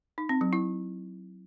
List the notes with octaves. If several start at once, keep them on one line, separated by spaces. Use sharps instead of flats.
D#4
C4
F#3
E4